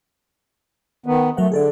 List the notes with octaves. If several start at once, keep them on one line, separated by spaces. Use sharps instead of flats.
D#3 B3
F#3 A3 A#4 F#5
D3 G#4 A4 D5